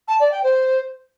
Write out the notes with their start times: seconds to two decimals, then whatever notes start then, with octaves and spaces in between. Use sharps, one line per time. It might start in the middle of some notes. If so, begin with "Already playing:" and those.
0.08 A5
0.20 D5
0.32 G5
0.43 C5